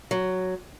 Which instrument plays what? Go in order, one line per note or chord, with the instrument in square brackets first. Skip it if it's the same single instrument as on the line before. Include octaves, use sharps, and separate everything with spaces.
[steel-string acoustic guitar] F#3